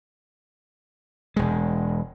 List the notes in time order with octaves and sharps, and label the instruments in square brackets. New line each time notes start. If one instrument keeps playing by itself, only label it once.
[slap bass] E1 G#3